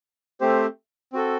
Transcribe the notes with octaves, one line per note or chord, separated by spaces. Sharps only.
A3 C4 G4 C5
C4 F#4 A4